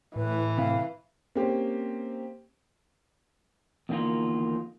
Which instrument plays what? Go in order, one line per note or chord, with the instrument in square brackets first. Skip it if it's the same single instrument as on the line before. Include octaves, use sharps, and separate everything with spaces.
[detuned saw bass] A2 [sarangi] E3 [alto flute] B4
[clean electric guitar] C3 [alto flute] F5
[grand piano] A#3 C4 C#4 G4 C5
[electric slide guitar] E2 D3 D#3 G3 A#3 F4